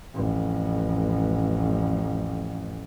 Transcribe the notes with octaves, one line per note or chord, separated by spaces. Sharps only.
A1 F2